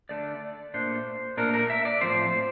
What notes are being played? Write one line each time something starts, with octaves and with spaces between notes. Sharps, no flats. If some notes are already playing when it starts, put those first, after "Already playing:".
D3 A3 D4 D5
A#2 A3 D4 C5
A#2 A3 D4 A#4
A#4
E5
D5
A2 F3 C4 C5